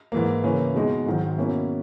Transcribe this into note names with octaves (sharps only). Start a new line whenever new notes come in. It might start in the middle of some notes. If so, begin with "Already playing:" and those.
G#2 E3 A#3
C#3 E3 A#3 C#4
B2 G#3 D#4
G#2 D#3 F#3
B2 A#3 C#4 E4